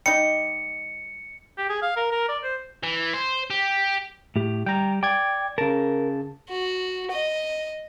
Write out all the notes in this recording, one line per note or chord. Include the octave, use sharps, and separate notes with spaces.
G3 D#4 D#5 C#7
G4
G#4
F5
A#4
A#4
D5
C5
E3
C5
G4
A2 G4
G3 G5 A#5
D5 G5 G#6
C#3 A#4 A5
F#4
D#5